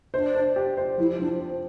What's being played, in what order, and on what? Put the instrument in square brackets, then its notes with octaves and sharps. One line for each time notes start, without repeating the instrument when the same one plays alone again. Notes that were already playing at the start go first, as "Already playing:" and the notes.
[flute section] D4 [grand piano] C5
[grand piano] C5
G4
C5
[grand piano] F3 [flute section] E4
[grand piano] F3 [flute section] D4
[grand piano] C4